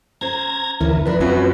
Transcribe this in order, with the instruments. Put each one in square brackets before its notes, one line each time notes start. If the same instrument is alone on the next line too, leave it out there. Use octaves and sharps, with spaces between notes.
[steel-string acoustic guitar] C#4 C5 [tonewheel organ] A#5 G#6
[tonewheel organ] D2 E3 A#4 [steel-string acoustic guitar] C#4 E4 B4
[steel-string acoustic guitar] F3 D4 A#4 [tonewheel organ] B4
[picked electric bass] F#2 [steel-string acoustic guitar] C4 F4 F#4